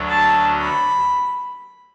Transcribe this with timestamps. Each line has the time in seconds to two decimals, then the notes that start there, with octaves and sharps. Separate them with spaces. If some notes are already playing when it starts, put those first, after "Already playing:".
Already playing: D2 D3 F#3
0.09 A5
0.58 B5